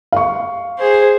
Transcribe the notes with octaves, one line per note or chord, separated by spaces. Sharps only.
F5 C#6
G#4 C5